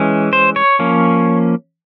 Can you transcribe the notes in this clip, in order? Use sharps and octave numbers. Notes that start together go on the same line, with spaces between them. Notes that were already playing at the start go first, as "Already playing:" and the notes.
Already playing: E3 G#3 C#4
C5
C#5
F3 A#3 C#4